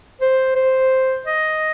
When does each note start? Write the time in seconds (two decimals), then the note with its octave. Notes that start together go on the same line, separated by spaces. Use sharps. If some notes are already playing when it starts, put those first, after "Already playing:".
0.21 C5
0.56 C5
1.26 D#5